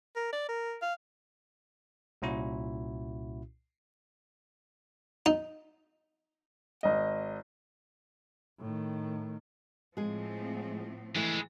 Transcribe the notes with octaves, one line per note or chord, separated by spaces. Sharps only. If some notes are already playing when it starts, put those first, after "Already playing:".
A#4
D5
A#4
F5
C2 A#2 C#4 E4 F#4
D#4
G#1 D#5
A2 D#3
A2 F3 G#3 C4 G#4
E3 G#3 A3 E4